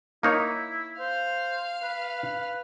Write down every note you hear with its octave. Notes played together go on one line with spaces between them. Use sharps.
A#3 D#4 E4 C#5
C5 F5
B4